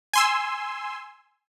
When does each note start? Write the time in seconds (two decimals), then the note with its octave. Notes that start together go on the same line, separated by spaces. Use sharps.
0.13 G#5 C6 E6